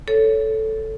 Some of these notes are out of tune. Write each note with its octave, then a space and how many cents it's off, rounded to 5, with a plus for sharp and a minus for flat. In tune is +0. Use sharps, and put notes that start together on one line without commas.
A4 +0 C#5 +15